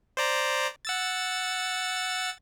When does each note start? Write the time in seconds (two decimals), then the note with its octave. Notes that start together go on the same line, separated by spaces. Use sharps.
0.17 C5 D5 A#5
0.85 F#5 E6 A6